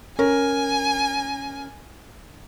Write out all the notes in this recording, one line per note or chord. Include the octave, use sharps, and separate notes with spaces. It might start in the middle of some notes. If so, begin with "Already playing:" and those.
C#4 A#4 G#5